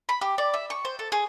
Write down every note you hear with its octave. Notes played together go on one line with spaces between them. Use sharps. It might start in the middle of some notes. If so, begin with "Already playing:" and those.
B5
G4
D5
E5
C#6
C5
A4
G#4